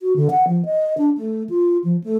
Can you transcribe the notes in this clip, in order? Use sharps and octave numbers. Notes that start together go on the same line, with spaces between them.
F#4
D3
F#5
F3
D#5
D4
A3
F4
F3
A3